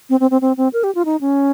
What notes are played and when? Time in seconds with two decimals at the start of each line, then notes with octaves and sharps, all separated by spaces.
0.10 C4
0.20 C4
0.31 C4
0.41 C4
0.57 C4
0.73 A#4
0.84 G4
0.95 F4
1.05 D#4
1.21 C#4